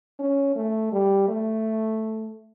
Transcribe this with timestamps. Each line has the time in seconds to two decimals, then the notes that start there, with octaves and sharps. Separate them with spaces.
0.19 C#4
0.56 A3
0.92 G3
1.28 A3